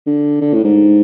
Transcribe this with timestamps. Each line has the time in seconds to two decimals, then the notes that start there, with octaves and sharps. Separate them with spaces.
0.07 D3
0.41 D3
0.54 A2
0.64 G#2